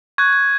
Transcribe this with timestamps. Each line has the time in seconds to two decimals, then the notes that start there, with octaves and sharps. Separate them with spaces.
0.18 C#6 F#6 G#6
0.33 G#6